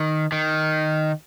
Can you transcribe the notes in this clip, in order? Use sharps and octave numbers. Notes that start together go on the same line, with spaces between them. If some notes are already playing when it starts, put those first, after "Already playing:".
Already playing: D#3
D#3